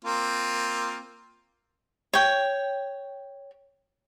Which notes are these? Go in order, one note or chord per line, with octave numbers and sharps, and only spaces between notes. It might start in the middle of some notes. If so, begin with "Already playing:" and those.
A#3 C4 F4
C#5 G5